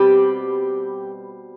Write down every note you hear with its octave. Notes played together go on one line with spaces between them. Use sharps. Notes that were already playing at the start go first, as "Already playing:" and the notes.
Already playing: B2 G3 C4 G4 B4